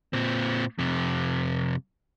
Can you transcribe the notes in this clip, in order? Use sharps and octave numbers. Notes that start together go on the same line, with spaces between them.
A#2 C4
F2 C3